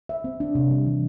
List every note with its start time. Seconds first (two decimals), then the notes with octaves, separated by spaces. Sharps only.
0.09 E5
0.24 C4
0.40 D4
0.55 C3
0.71 G3
0.86 E3